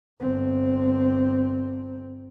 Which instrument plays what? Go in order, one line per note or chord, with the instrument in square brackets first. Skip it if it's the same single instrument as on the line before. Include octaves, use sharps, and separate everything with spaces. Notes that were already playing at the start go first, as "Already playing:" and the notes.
[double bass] G1 C4